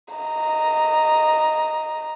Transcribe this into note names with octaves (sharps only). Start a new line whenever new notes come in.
D#5 A#5